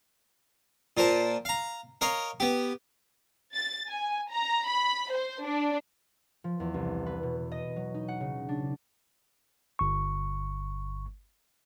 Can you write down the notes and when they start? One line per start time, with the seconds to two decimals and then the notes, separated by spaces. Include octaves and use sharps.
0.97 A#2 A#4 C5 A5
1.45 F5 A#5
2.01 A#4 C#5 D#5 F5
2.40 B3 G4
3.53 A6
3.88 G#5
4.30 A#5
4.65 B5
5.12 C5
5.42 D4
6.44 F3
6.60 E2
6.74 C2
7.06 B4
7.23 B2
7.51 D#5
7.76 F#3
7.94 D#4
8.08 F#5
8.20 C#3
8.49 D4
9.79 G1 C#6